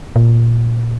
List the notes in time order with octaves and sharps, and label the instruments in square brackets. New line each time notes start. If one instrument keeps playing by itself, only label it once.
[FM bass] A#2